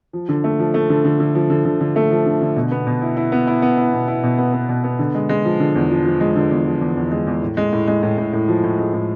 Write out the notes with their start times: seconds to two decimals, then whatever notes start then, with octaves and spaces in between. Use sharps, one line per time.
0.13 F3
0.29 D3
0.44 A3
0.59 F3
0.74 A3
0.90 D3
1.05 D3
1.20 D3
1.35 F3
1.50 D3
1.65 D3
1.81 D3
1.96 A3
2.11 F3
2.26 D3
2.41 D3
2.56 B2
2.71 B3
2.87 B2
3.02 E4
3.17 E4
3.32 B3
3.47 E4
3.62 B3
3.78 E4
3.93 B2
4.08 E4
4.23 B2
4.38 B3
4.54 B3
4.69 B2
4.84 B3
4.99 D3
5.15 G#3
5.29 G#3
5.45 F3
5.60 D3
5.75 E2
5.90 F3
6.06 F3
6.21 G#3
6.36 D3
6.51 E2
6.66 F3
6.81 E2
6.97 E2
7.12 G#3
7.27 E2
7.42 A2
7.57 G#3
7.73 A2
7.87 G#3
8.03 A2
8.18 A2
8.33 A2
8.48 F3
8.64 A2
8.79 G#3
8.94 A2